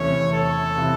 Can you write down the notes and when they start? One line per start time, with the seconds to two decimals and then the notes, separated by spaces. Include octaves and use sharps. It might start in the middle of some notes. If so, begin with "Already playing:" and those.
Already playing: E2 C3 E3 A3 C#4 C#5
0.33 A4
0.77 C3 E3